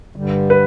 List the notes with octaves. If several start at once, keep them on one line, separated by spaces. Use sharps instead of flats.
G2 D3 G3
B4